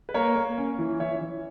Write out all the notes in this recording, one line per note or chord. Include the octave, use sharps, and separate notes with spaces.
B4
A#3 A#4 C#5
A#3
C#4
E3
E3 C#5 E5
E3